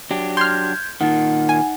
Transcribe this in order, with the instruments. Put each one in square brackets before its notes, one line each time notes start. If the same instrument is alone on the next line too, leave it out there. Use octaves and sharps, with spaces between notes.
[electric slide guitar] F#3 D4 G4
[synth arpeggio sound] C6 F6 [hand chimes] G6 G#6
[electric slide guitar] A#2 D#3 [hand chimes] D#4 F#5
[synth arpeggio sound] G#5